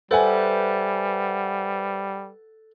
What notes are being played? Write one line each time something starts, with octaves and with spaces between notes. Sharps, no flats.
G3 A4 B4 C5 E5 F#5 G#5